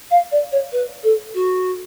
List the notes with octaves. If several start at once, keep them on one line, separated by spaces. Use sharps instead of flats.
F5
D5
C#5
B4
A4
F#4